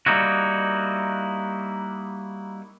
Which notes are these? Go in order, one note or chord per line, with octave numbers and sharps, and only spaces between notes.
G3 A#3 D#4 E4 F#4